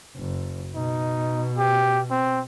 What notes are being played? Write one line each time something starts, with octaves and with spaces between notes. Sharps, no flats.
F#1
B2 D#4
G4
C4